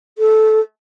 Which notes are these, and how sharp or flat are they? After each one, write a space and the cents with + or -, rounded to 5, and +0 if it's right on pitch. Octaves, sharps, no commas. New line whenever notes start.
A4 -15